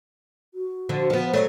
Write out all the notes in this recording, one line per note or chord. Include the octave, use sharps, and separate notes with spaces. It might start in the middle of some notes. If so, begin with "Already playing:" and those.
F#4
D3 F3
F3 B3
F#3 G#3 A3 C#5